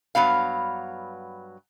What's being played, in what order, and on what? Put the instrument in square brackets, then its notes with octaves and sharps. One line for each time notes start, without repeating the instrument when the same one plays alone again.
[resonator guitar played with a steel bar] G2 F#3 B3 F5